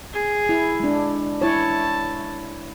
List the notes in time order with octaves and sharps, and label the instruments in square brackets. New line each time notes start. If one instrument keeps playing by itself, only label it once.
[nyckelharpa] G#4
[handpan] E4
G#3 D4
[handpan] E4 C#5 [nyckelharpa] A5